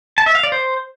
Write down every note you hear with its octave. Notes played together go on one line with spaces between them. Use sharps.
A5
E5
F5
D5
C5